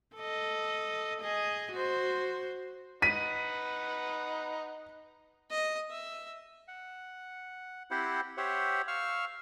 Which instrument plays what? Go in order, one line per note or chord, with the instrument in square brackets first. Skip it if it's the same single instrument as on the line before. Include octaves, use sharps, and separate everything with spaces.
[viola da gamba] A4 D#5
G#4 D#5
F#4 C5
[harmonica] D#4 B4 F#5 [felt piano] B6 [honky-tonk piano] D#7
[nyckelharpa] D#5
E5
[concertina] F#5
C4 E4 G4 C5 F#5
G4 C5 C#5 E5 F#5
F5 C#6 E6 F6